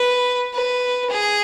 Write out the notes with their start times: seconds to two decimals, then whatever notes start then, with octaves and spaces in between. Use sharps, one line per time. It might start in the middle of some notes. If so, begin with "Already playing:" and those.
Already playing: B4
0.54 B4
1.10 G#4